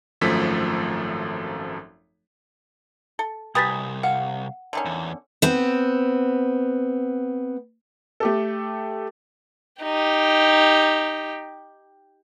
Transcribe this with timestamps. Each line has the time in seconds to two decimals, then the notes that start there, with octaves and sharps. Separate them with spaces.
0.21 G#1 F#2 F3 A3 A4 B6
3.19 A4
3.55 C2 G4 B4 G#5 D#6 A6 B6
4.03 F5 F#5
4.73 D3 D#3 C#4
4.85 E2
5.42 B3 C4
8.20 A3 G4 A4
9.82 D#4 G4